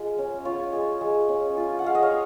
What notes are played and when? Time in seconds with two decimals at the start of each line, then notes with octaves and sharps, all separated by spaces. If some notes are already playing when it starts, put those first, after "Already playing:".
Already playing: G#3 F4
0.18 C#4
0.45 F4 C#5
0.73 G#3
1.01 G#3
1.29 C#4
1.57 F4
1.79 F#5
1.84 G#3 F5
1.95 D#5
2.03 C#5